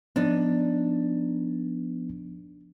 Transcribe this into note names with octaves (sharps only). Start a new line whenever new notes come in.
F3 B3 D4 D#4